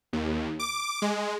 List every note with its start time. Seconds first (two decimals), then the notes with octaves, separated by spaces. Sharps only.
0.13 D#2
0.59 D6
1.02 G#3